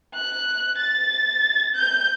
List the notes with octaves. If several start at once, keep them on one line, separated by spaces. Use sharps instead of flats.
F#6
A6
G6